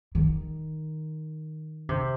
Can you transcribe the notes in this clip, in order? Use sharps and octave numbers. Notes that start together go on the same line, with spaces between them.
D#3
C3